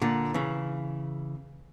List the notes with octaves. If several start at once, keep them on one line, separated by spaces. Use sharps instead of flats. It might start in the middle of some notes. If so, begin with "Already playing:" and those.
A#2 D3
C#3 E3